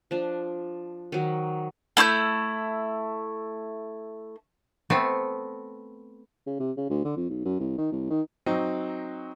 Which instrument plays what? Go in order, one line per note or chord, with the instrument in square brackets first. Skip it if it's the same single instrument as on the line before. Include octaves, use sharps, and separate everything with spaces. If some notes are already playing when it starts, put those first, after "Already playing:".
[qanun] F3 D4
D#3 F#3
[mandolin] A3 E4 C6 G6
[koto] A3 B3 C4
[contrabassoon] C#3
C3
C#3
D2
D3
F2
B1
F#2
C2
D#3
C2
D#3
[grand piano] F#3 C4 D#4